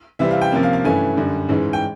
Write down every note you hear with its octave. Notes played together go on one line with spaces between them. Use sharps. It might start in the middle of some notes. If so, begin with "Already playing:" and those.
C3 E3 G3 C4 E5
F5
G5
C3 F3 A#3 C#4
F5
F5
G2 E3 A3 C#4 G#5
F#2 D3 G3
G#2 E3 G#3 C#4
G5